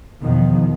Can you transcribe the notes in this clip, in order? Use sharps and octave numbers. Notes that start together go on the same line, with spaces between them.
E2 B2 D#3 F3